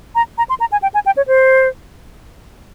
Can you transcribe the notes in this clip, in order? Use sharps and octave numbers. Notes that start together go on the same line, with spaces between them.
A#5
A#5
C6
A#5
G#5
G5
G#5
G5
C#5
C5